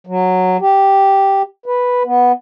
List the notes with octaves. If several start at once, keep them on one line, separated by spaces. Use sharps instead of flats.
F#3
G4
B4
B3